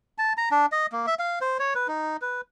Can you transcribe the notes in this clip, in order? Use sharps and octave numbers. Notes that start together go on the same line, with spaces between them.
A5
A#5
D4
D#5
A#3
E5
F5
C5
C#5
B4
D#4
B4